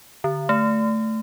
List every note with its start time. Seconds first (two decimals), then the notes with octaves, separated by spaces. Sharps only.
0.24 D3
0.49 A3